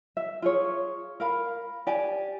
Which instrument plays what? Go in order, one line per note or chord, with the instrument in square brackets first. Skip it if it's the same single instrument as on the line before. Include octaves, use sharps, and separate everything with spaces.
[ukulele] E5
F4 G#4 C#5
A#4 F5 B5
G4 D5 G#5